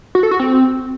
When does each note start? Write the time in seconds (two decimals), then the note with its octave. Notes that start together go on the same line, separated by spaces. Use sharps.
0.15 F#4
0.23 A4
0.31 F#4
0.40 C4